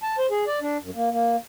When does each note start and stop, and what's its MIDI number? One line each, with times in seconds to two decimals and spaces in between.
0.03 0.16 81
0.19 0.27 72
0.31 0.44 68
0.47 0.59 74
0.62 0.77 62
0.82 0.91 42
0.95 1.09 58
1.11 1.36 58